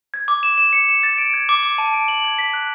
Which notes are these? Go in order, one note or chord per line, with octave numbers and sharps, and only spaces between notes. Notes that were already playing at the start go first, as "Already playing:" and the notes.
G#6
D6
E7
E7
C#7
E7
A6
D7
G#6
D6
D6
A5
D7
F#7
G#6
B6
F#6